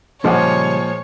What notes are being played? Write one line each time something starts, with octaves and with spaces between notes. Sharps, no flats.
A#2 C#3 F3 G3 G#3 C#5 F#5